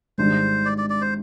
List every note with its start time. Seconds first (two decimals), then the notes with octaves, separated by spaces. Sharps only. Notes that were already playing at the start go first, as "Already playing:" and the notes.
0.18 G#1 G#2 G3 D4 C5
0.65 D5
0.78 D5
0.90 D5
1.01 C5